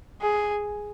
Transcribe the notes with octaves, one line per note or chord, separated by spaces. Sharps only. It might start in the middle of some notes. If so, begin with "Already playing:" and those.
G#4